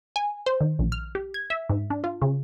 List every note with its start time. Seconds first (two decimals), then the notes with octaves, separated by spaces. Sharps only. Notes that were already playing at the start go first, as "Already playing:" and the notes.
0.16 G#5
0.46 C5
0.61 D#3
0.79 A#1
0.92 F6
1.15 G4
1.34 G#6
1.50 E5
1.69 G#2
1.90 D4
2.04 F4
2.22 C#3